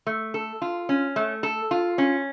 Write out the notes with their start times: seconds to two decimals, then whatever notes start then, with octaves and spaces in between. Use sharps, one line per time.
0.07 A3
0.34 A4
0.62 F4
0.89 C#4
1.16 A3
1.43 A4
1.71 F4
1.98 C#4